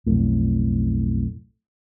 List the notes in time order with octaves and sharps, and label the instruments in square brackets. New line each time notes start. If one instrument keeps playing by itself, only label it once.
[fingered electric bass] B1 F2 A2